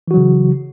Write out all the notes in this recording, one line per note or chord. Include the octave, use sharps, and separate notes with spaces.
C#3 E3 F#3 F#4